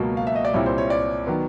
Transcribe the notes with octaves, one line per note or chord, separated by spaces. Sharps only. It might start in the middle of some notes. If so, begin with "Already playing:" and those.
Already playing: C#2 B2 F#3 A#3
F5
E5
D#5
D5
C2 A#2 G3 C4 E4 C#5
C5
C#5
D5
D#3 F#3 B3